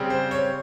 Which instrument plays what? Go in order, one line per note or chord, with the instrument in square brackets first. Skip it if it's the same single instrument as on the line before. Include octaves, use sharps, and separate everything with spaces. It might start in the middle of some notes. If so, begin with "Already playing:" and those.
Already playing: [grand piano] C#3 G3 C4
C5
C#5